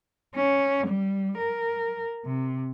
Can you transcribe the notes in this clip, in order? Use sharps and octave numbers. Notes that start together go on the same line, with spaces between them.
C#4
G3
A#4
C3